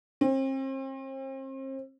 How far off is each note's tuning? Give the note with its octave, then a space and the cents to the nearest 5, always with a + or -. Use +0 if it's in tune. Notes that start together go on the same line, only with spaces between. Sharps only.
C4 +40